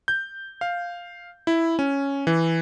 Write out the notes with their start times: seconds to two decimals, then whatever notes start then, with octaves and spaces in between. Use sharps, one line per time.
0.08 G6
0.61 F5
1.47 E4
1.79 C#4
2.27 E3